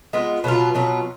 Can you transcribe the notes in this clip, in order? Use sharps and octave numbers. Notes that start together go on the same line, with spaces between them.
G#3 B3 F4
B2 F#3 B3 F4
B2 F#3 B3 F4